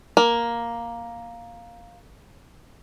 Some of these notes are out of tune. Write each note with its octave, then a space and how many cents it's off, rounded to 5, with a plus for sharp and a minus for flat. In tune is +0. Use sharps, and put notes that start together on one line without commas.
A#3 +5